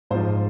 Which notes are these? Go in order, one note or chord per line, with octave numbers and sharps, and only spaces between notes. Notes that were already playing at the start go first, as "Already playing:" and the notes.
G#2 F3 C5